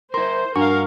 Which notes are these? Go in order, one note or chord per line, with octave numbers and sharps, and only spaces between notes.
E4 A#4 C5 C6
G2 D4 F#4 A#4 F5 C#6